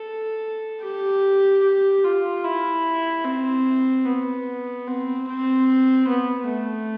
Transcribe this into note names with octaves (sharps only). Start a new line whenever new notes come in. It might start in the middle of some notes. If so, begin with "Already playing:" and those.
Already playing: A4
G4
G4
F4
E4
C4
B3
C4
C4
B3
A3